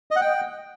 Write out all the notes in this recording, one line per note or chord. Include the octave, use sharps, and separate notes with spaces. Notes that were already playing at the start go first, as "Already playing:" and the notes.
D#5
F#5
G5